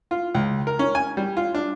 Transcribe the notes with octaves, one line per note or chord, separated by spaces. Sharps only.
F4
C#2
A#4
C#4
G#5
G3
F4
D4